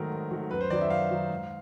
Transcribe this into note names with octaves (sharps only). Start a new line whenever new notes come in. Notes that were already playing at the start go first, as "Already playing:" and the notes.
Already playing: G#2 D#3 F#3 A3 A#4
G#2
D#3 F#3 A3
F#2 B4
C5
D#3 F#3 D5
E5
F#2 F5
D#3 F#3
G#2